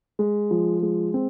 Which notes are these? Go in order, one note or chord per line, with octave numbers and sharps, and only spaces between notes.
G#3
F3
G#3
C4